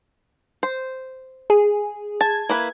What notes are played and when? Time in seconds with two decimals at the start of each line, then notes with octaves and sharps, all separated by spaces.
0.63 C5
1.50 G#4
2.21 A5 G#6
2.49 A#3 E4 B4